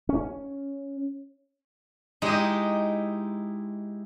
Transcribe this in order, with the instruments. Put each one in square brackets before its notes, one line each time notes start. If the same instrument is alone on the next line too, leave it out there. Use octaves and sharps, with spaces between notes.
[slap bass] C#4
[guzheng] G#3 D#4 [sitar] E4 G4 D#5